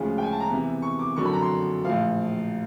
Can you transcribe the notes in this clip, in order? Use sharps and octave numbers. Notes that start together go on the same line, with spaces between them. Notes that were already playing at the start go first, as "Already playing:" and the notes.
Already playing: D2 C#3 F3 G#3 C#4
G5
G#5
A5
A#5
E2 C3 E3
C#6
D6
F#1 F2 D3 F#3 C#6
B5
A#5
C6
A#1 A2 F3 F5